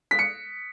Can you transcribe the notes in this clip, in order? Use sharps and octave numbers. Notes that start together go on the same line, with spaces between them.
B6
C#7